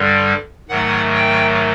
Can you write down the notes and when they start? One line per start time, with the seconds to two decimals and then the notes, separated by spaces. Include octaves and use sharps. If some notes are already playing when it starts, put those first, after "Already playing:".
Already playing: G2 D3 G3
0.69 G#2 D#3 F#3 A3 F#5
1.15 G5